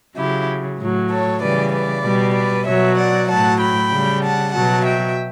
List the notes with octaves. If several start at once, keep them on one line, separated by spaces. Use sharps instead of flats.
C#3 F#3 E4 G4
A2 F#3
A4 C#5
C#3 E3 G3 B4 D5
B4 D5
B2 G3
B4 D5
B2 F#3 C#5 E5
D5 F#5
A2 F#3 F#5 A5
G5 B5
C#3 G3
F#5 A5
B2 F#3 F#5 A5
E5 G5